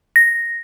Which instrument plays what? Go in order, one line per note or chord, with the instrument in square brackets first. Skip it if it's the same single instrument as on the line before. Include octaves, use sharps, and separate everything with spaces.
[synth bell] A#6